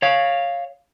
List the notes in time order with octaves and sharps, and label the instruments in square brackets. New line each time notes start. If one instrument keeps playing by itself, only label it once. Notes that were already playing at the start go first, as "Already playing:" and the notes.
[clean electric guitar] C#5 F5